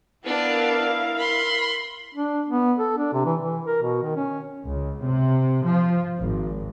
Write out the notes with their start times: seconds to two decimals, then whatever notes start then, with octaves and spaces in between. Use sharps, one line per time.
0.24 B3 D4 E4 A#4 F5
1.18 B5 C6
2.14 D4
2.48 B3
2.79 A4
2.97 D4
3.13 C3
3.26 E3
3.40 E3
3.66 A#4
3.82 B2
4.03 D#3
4.16 C#4
4.67 C#2
5.03 C3
5.66 F3
6.18 G#1